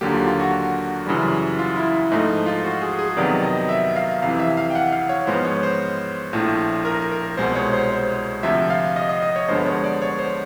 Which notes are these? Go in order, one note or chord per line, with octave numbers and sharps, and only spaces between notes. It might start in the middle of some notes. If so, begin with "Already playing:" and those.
D#2 D3 F#3 A#3 G4
F4
F4
F#4
F#2 C#3 E3 G3
F4
E4
G#2 F3 A3 D#4
F4
F#4
G#4
G#4
F2 C3 D#3 F#3 B3 D5
D#5
E5
F5
F2 C3 E3 F5
E5
F5
G5
F#5
F5
C#5
G#2 F3 G#3 B3 C5
C#5
C5
A#1 A2 F3 A3
A#4
A#4
C2 B2 G#3 C5
C#5
C5
C5
D2 C3 F3 E5
F5
D#5
D#5
D#5
C#5
G2 D3 F3 G#3 B3 C5
C#5
D5
C#5
C5